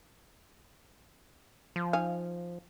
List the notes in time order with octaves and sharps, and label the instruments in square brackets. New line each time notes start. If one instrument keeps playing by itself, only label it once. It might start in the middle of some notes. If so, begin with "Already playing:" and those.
[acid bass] F3
[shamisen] D#4 F5 G#5